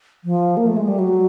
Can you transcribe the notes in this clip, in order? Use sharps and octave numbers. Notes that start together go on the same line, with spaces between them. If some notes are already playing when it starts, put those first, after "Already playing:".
F3
A#3
A3
G#3
G3
F#3